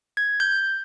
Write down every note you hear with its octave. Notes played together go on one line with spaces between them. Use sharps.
G#6
G6